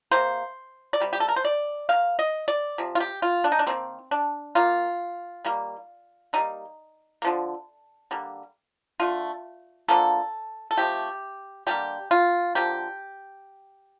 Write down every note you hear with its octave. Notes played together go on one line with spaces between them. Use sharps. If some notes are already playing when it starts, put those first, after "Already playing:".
C3 G3 A#3 C5
D5
C3 G3
G4
A4
A#4
C5
D5
D#3 A#3 F5
D#5
D5
C3 F3
F4
G4
F4
D4
D#4
D4
D#3 G3 A#3 C4
D4
D#3 A#3 F4
D#3 G3 A#3
D3 G3 A#3 D#4
A#3
D3 F3
D3 G3 A#3
D3 A3 F4
D3 F3 A#3 A4
A4
C3 F3 A3 G4
D3 G3 A#3 G4
F4
D3 F3 A#3 G4